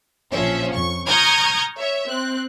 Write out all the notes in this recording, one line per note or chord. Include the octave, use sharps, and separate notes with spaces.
A#1 F3 C#4 E5
F2 C#6
A#5 C#6 D#6 F6 G6 G#6
C#5 E5
C4 F#6